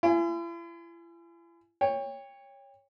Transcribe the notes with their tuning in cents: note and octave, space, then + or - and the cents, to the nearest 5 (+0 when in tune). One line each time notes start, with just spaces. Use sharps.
E4 +45 G#5 +0
C#5 +0 G5 +30